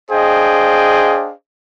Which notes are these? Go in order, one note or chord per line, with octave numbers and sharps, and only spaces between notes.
D4 G#4 C5 D#5 F5 G5